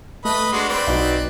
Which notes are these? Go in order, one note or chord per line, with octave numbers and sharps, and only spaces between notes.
A3 B4 D#5 B5
G#3 D4 F#4 C6
C4 B4 D5
B1 D#4 F#4